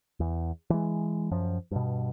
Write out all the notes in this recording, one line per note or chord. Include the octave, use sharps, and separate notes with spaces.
E2
E3 G#3
F#2 F3
G2 B2